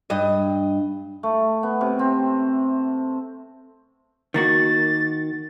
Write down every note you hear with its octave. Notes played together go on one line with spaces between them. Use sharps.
G2 D#5
A3
B3
C3
C4
D#3 A#3 F#4 A6